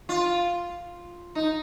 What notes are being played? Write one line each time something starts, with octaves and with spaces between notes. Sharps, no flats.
F4
D#4